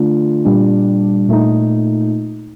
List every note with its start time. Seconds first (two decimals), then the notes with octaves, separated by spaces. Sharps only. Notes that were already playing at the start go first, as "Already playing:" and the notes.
Already playing: D3 A3 D4 F4
0.45 A#2 G3 D4
1.28 A#2 A3 D#4